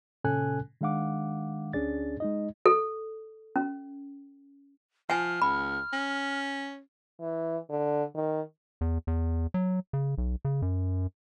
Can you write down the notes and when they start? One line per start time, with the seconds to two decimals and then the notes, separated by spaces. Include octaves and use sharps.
0.24 A#2 C#3 C#4 A4 G#5 F#6
0.81 D#3 G#3 D4 F5 F#5 D6
1.73 D2 C#4 D4 G#4 D5 A6
2.20 G#3 D#4 D#5
2.66 A4
3.56 C#4
5.10 F3 F#5 G#5 F6
5.42 C#2 B5
5.93 C#4
7.21 E3
7.70 D3
8.15 D#3
8.81 E2
9.07 E2
9.54 F#3
9.93 C#3
10.18 B1
10.45 C#3
10.62 F#2